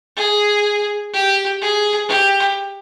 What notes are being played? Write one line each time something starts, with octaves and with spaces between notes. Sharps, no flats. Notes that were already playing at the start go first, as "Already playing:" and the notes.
G#4
G4
G#4
G4